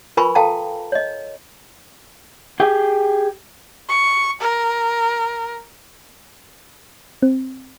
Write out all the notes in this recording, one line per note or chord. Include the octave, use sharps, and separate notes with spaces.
F4 A#4 B4 G#5 B5 C#6
A4 F5 G5 A5 A#5
C#5 D#5
G4 G#4 G5
C#6
A#4
C4